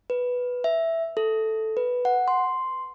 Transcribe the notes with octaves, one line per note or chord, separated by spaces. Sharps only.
B4
E5
A4
B4
F#5
C6